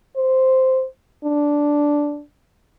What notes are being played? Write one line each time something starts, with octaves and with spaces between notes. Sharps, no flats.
C5
D4